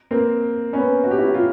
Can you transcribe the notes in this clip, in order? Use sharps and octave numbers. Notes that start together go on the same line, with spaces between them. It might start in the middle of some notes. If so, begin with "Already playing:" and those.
A#3 C4
B3 C#4
F#4
G4
E4 F#4
F4 G4